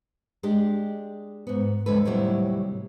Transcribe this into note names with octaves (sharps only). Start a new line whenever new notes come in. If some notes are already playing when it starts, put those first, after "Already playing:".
G#3 D4 G4
G#2 B3
F2 D3 G#3 A4 B4
D#2 A2 C3 F#3 G3 E4